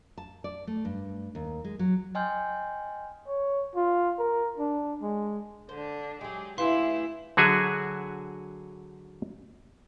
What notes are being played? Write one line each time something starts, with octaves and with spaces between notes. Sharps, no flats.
A5
D5
A3
G2
D#2
G#3
F#3
D#5 G5 G#5 C6 F6 G6
C#5
F4
A#4
D4
G#3
D3 D4 C5
F#3 G#3 G4 G#4
D2 E3 E4 G4 G#4 B4 F5 C6
D3 F#3 F#4 G#4 E5 G#5